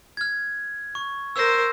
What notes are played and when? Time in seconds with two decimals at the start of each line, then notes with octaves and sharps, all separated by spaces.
0.17 F6 G#6
0.95 C#6
1.36 A#4 C5 E6 A#6